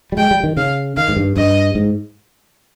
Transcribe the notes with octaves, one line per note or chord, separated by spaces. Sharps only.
G3
G#3 G5
G3
D#3
C#3 F5
D#3 F5
G#2
G2
G2 D#5
G#2